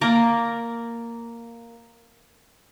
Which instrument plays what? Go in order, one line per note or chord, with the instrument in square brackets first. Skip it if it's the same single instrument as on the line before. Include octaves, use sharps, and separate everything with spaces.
[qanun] A#3 A#4 D5 A#5